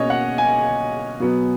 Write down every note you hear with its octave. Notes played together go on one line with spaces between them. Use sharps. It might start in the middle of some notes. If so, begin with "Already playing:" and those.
Already playing: B2 A#3 C#4 C#5 D#5
F#5
G#5
B2 F#3 B3